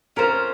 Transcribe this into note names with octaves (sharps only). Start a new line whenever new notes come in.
C#4 F4 A#4 C5